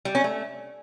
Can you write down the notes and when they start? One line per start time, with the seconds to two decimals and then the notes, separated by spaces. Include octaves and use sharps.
0.05 G3
0.15 C#4
0.24 A3